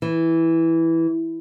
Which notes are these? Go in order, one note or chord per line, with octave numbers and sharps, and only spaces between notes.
E3